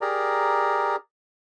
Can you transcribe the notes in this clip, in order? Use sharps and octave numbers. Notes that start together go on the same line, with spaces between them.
G4 G#4 A#4 D5 A#5